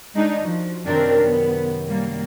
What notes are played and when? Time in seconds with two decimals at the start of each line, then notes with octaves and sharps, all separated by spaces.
0.15 G#3 D4 D#4
0.44 F3 F#4
0.87 F#2 C3 D#3 C4 D4 A#4
1.22 B3
1.88 G3 A#3